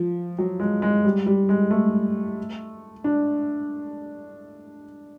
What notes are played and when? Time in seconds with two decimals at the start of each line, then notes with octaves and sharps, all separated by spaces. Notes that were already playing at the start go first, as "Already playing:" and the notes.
Already playing: F3
0.39 F#3
0.60 G#3
0.82 G#3
1.05 G3
1.26 G3
1.49 G#3
1.71 A3
3.04 D4